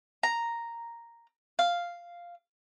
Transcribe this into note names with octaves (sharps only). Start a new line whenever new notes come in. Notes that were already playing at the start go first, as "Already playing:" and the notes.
A#5
F5